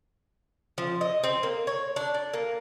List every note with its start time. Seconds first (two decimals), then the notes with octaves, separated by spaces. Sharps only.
0.78 F3
1.01 D#5
1.24 C4
1.43 A#3
1.67 C#5
1.96 D4
2.14 D5
2.34 A#3